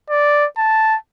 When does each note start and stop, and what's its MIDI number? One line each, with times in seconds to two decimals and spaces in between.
0.10 0.46 74
0.57 0.96 81